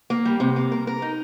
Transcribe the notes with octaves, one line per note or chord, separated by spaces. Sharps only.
A#3
G3
C3
A#3
A#4
A#4
D#4